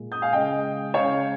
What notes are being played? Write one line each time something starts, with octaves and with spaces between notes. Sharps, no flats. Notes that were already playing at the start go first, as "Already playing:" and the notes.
Already playing: A#2 G#3
D#6 G6
F5 G#5
C#3 G#3 D#5 G5
C#3 G#3 C#5 F5